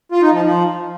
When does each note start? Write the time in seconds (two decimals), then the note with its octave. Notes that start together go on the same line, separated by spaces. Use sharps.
0.12 F4
0.22 D#4
0.32 F3
0.43 F3